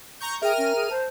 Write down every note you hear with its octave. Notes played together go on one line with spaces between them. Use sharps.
A#5 C#6 G6
G#4 A#4 E5 G5 F6 D#7
C#4
G#4
C5 A5